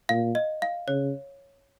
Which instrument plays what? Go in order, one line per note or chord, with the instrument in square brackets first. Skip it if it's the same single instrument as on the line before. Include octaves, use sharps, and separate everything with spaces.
[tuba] A#2 [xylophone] F5
[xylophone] D#5
F5
[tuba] C#3 [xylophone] C#5